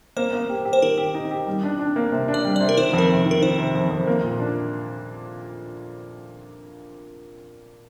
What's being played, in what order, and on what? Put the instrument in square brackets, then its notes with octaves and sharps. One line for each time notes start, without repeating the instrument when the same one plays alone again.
[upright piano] A#3 [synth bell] C5
[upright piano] A#3
G4
G4
[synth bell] C5
[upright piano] D#3 [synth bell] A#4
[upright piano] G4
D#4
G4
G3
D4
D4
A#3
C3
D4
[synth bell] D5
[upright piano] G3
[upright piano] C3 [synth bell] D5
[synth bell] A#4
[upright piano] D#3 [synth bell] C5
[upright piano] F2
[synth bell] A#4
[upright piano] C3
D#3
[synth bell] A#4
[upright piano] D#3 [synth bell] C5
[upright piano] C3
F2
F2
A#3
A#2
D4